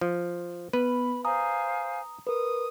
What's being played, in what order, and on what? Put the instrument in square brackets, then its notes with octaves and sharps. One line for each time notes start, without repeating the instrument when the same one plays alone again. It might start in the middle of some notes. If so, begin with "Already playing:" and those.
[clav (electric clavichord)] F3
[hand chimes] B3 [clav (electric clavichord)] B4 [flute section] B5
[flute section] C5 F5 G#5 [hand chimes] A#5 D#6
[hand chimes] A#4 B4 [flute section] D#6